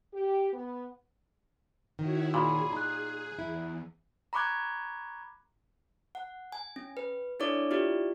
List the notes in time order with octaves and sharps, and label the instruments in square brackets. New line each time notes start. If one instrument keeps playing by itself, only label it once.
[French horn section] G4
B3
[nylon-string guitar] D#3 [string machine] E4 F#4 C#5
[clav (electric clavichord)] A#2 [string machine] G#4 [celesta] B5
[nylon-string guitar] D#4 [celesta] A#5 F#6
[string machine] E2 [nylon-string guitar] E4
[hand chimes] A#5 B5 C#6 D6 F#6 G#6
F#5
G#5
C#4
B4
D4 E4 A4 C#5 D5 D6
E4 F4 G4 D5